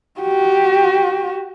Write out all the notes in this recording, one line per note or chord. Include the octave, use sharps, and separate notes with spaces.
F#4 G4